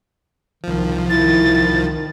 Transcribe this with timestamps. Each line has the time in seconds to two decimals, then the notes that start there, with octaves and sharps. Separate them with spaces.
0.64 C2 D#3 F3
1.10 D#3 E4 A6